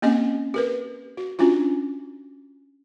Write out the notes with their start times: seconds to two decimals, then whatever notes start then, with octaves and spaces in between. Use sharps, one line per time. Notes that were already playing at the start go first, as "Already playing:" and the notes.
0.02 A#3 C4 C#4 G4 D#5 G#5
0.54 G4 A#4 B4
1.17 F#4
1.39 C#4 D4 F4 F#4